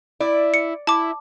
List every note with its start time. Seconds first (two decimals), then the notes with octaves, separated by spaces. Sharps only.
0.20 E4 D5
0.54 C#7
0.87 E4 A5 D6